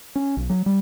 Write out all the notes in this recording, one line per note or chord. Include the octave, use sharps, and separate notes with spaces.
C#4
B1
F#3
G3